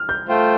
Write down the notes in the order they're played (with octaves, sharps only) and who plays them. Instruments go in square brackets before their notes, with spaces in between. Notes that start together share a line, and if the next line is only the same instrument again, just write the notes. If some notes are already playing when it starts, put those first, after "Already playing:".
Already playing: [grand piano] F6
G6
[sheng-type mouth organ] A3 F4 C5 G5